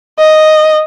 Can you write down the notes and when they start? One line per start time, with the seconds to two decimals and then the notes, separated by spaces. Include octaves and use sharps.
0.19 D#5